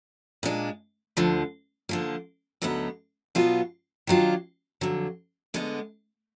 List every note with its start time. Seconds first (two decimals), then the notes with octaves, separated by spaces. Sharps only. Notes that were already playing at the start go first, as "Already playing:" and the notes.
0.43 A#2 G#3 D4
1.17 D2 D3 F3
1.89 D3 F3 A#3
2.62 D2 D3 F#3 B3 D#4
3.35 B2 F#3 B3 F4
4.07 D#3 F#3 D4 F4
4.81 F2 D3 F#3
5.54 D2 D3 G#3 B3